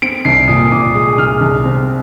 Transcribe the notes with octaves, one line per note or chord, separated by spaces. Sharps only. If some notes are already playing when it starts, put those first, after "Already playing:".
C4 D7
C2 C7
A#2 D#6
C2 D6
G#3 D#6
C2 F6
C2
C4